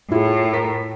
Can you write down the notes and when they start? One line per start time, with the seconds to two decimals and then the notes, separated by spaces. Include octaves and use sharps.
0.12 A2 E4 F4 G#4
0.53 A#4 B6